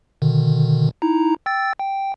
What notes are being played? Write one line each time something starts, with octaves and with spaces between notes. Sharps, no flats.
B2 D3 D#3
D#4 E4 A#5
G5 E6 A6
G5